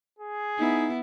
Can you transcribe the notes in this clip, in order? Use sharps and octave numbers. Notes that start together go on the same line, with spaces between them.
G#4
B3 D#4 E4